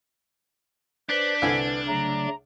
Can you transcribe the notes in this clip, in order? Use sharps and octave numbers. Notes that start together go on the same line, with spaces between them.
D4 B4 C5 F#6 B6
C2 D3 B4 G#5
C#3 F#3 A3 A#5